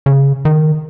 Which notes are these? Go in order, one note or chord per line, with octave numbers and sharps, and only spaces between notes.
C#3
D#3